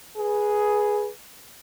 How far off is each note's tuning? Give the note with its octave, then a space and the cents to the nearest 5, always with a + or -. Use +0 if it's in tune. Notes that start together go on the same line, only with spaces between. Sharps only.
G#4 +5 B4 -15